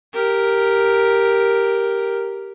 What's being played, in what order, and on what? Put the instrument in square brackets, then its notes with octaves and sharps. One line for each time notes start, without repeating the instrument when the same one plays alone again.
[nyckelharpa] G4 A#4